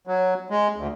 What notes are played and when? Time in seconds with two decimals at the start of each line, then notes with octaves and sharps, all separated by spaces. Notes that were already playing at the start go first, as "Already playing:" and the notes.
0.07 F#3
0.50 G#3
0.76 D2